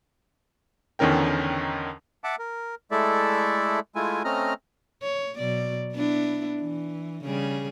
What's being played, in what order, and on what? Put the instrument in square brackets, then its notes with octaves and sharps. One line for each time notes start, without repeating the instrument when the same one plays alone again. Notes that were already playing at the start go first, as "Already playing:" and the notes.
[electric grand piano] E2 D3 D#3 C#4 A#4 G5
[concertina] E5 F#5 A5 D6
A#4
G#3 A3 E4 A4 D5 E5
G#3 A3 E4 F4 G#5
A3 C4 C#4 D#5 A#5 F6
[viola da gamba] C#5
B2 F#3 D5
B3 D4 E4
E3
C#3 G3 G#4